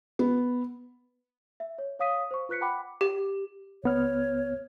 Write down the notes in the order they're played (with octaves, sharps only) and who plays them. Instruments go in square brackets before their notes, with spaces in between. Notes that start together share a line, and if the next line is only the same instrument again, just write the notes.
[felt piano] B3
[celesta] E5
C#5
C#5 F5 D#6 B6 D#7
C5 C#6
F4 B4 F#6 B6 C#7
F#5 G5 A5 B5 D6
[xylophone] G4
[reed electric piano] C#2 B3 F6 [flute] C#5